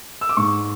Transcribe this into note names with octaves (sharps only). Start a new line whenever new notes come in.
E6
D6
G#2 C#6